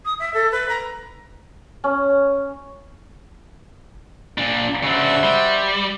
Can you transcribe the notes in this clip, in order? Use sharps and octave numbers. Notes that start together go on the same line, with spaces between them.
D#6
E5
A4
B4
A#5
C#4
A#2 D4
C#3 D4 F#4 C5 E5
G3